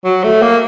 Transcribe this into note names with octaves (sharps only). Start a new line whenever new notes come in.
F#3
A3
A#3